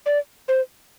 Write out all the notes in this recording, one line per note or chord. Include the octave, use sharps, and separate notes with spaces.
D5
C5